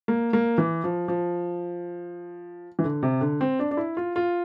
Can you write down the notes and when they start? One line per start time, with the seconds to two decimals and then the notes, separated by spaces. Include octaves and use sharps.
0.08 A#3
0.33 A#3
0.58 E3
0.84 F3
1.08 F3
2.79 E3
2.84 D3
3.03 C3
3.21 D3
3.41 C4
3.59 D4
3.71 D4
3.77 E4
3.97 F4
4.16 F4